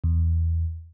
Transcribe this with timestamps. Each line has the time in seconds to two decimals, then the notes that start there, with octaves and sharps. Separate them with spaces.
0.04 E2